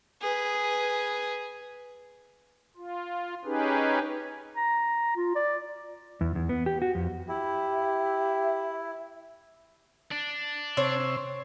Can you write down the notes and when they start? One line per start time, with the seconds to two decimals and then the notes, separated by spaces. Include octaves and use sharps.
0.22 G#4 B4
2.76 F4
3.45 C#4 D#4 G4 G#4 B4
4.56 A#5
5.16 F4
5.36 D5
6.21 E2
6.35 E2
6.49 B3
6.66 G4
6.82 F#4
6.95 F2
7.29 E4 G4 E5
10.11 D4
10.77 C3 C5 C#5 E6